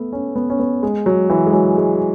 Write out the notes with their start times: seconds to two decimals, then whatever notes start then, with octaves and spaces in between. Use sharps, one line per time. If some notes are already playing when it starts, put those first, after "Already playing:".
Already playing: A3 B3
0.13 C#4
0.36 B3
0.50 C#4
0.59 B3
0.83 G#3
1.06 F#3
1.30 E3
1.46 G#3
1.53 F#3
1.77 G#3